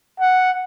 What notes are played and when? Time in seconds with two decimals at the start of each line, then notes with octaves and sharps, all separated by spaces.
0.20 F#5